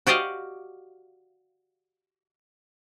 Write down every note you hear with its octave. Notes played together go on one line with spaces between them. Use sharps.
F#4 G4 D5 D#5 F5